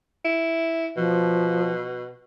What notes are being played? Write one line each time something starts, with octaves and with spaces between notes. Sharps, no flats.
E4
B2 F3